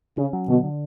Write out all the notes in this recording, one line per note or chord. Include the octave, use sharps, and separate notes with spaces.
C#3 C#4
F#3
B2 D3
D3